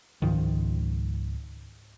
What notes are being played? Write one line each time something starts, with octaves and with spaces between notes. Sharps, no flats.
C#2 G#2 D#3 F3